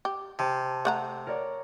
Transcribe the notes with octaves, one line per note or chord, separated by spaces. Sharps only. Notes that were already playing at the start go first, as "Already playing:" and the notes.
G4
C3 A5
A3 F#5 A#5
A#4 C#5 D5